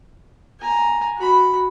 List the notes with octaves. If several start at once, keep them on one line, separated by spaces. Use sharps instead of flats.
G#5 A#5
F#4 B5